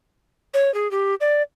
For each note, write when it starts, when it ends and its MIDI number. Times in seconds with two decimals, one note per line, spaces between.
0.54 0.73 73
0.74 0.90 68
0.91 1.15 67
1.21 1.42 74